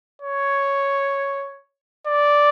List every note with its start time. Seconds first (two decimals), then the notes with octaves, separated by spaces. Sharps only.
0.21 C#5
2.07 D5